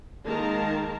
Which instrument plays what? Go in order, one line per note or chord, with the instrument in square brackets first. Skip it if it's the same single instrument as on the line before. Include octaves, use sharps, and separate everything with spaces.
[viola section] D#3 G#3 A#3 A#4 A5 A#5